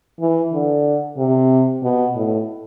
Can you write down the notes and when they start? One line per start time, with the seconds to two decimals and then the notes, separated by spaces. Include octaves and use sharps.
0.20 E3
0.53 D3
1.18 C3
1.83 B2
2.16 A2